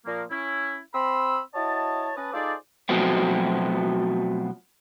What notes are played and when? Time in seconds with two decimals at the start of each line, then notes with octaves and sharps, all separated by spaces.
0.06 A#2 F3 A#3
0.31 C#4 E4
0.94 C4 B5 C6 E6
1.54 E4 F#4 C#5 D#5 A5
2.16 C#4 B4 A5 D#6
2.33 D#4 F4 G#4 A4 C5 D5
2.89 B2 F3 F#3 A3 B3 C4